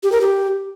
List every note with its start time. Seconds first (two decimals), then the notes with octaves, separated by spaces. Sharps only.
0.03 G4
0.12 A#4
0.21 G4